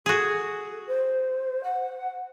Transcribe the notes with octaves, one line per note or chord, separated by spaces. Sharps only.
F#4 G#4 A4
C5
F#5